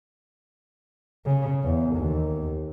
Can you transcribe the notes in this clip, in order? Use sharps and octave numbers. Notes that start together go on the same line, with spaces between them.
C#3
E2
D#2